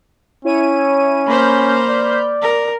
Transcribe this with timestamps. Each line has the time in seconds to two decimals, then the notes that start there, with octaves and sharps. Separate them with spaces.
0.45 C#4 E4 C#5 D#7
1.27 A#3 C5 B5 F6 G6
1.89 D5
2.42 A#4